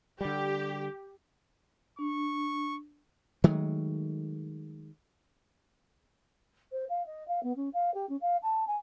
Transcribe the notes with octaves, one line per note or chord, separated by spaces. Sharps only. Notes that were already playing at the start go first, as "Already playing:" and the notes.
D3 G3 G4
D4 C#6
D#3 F#3 G#3 A3
C5
F5
D#5
F5
B3
C#4
F5
G4
C#4
F5
A5
G#5